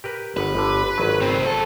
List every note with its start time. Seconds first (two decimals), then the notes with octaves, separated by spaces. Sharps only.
0.04 G4 A#4 B4
0.37 G1 B4 F#5
0.55 G1 D3
0.98 G#1 F#3
1.22 C#2 C4
1.46 F#2 A4